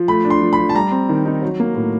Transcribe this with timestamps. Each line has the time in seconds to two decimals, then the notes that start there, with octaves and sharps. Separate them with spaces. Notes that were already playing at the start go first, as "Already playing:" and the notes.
Already playing: F3
0.08 A3 B5
0.25 D4
0.30 C6
0.41 F3
0.53 B5
0.58 F3
0.69 A5
0.75 G3 A#5
0.92 C4
1.09 D#3
1.26 D#4
1.42 F#3
1.60 A#3
1.75 A2